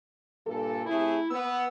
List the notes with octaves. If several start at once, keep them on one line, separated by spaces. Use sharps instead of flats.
G2 A#2 A4
C3 A3 E4 G#4
B3 E6